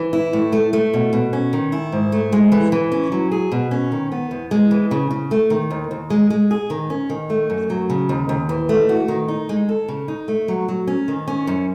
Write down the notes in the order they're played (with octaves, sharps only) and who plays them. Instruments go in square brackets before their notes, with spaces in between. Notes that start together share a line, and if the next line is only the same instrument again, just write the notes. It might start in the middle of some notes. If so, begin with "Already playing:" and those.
Already playing: [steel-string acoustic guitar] E3
E4
A2
A3
A3
B2
B2
C#4
D#3
E4
G#2
A3
G#3
E3
E3
C#4
F#3
G#4
B2
C#4
D#3
B3
E2
G#3
E3
C#3
C#3
A3
D#3
D#2
D#2
G#3
G#3
G#4
D#3
C#4
D#3
A3
F#2
F#3
C#3
D#2
D#2
E3
A3
F#4
D#3
D#4
G#3
A4
C#3
D#4
A3
F#3
F#3
C#4
D#3
C#4
F#2